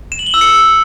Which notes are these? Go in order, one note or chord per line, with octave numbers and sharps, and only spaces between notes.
E7
F#7
G7
E6
C#7